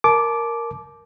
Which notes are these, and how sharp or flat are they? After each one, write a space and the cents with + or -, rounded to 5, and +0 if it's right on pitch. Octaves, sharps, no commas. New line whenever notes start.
A#4 -5 A5 -30 D6 +0